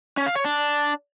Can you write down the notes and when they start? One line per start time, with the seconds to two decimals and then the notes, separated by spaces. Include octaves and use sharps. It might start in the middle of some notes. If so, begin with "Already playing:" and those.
0.17 C#4
0.26 F5
0.35 C#5
0.45 D4